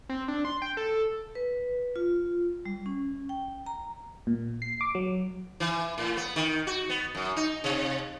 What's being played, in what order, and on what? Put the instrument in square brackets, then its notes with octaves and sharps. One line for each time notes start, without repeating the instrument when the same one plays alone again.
[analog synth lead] C4
D4
C6
G5
A4
[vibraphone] B4
F4
G3
C#4
G5
A#5
[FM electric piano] A#2
C7
D6
F#3
[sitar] E3
A2
B3
D#3
F#4
B3
F#2
D#4
C3